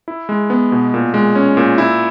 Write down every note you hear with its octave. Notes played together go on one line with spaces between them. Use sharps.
E4
G#3
B3
B2
A#2
G#3
C#4
A#2
E4